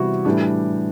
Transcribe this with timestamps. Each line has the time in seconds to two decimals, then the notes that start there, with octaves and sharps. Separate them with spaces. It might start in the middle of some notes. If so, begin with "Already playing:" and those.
Already playing: C3 E3 G3 B3 E4 F#4
0.25 A2 E3 G3 D4 G4